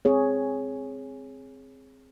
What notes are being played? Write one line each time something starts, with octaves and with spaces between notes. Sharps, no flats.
C4 G#4 C#5